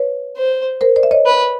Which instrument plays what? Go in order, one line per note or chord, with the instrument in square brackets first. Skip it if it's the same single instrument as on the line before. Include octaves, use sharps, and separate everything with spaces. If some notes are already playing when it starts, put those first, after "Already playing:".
Already playing: [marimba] B4 C#5
[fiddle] C5
[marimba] A#4 C5
C5 D5
E5
C#5 D#5
[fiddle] B4